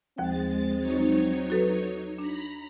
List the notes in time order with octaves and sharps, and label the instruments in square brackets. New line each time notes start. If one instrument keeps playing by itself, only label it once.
[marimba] D#2 F3 G5 [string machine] G#3 A6 [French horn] C4
[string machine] F#3 D#4 C#5
[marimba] F#4 A4 B4
[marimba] D4 [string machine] A#5 B5